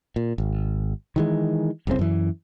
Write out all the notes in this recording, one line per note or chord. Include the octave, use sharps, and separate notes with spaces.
A#2
G#1
D#3 E3 G#3
F1 C2 C#3 C4
F#2 E3